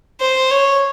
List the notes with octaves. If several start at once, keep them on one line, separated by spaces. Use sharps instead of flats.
C5
C#5